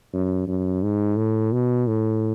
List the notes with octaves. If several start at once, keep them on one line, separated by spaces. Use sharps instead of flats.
F#2
F#2
G#2
A2
B2
A2